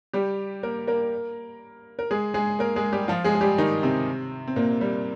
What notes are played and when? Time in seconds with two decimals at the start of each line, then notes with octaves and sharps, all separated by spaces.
0.13 G3 G4
0.63 A#3 A#4
0.88 A#3 A#4
1.99 A#4
2.11 G#3 G#4
2.34 G#3 G#4
2.59 A#3 A#4
2.76 G#3 G#4
2.93 G3 G4
3.08 F3 F4
3.24 G#3 G#4
3.35 G#4
3.41 G3 G4
3.58 D#3 D#4
3.83 C3 C4
4.47 C4
4.56 A#2 A#3
4.81 G3